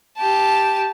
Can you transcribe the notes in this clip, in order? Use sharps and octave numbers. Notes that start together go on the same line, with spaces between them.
G4 A5